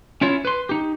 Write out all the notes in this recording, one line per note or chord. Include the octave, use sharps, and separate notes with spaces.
C#4 E4 F4 C#5
B4 C6
D#4 G4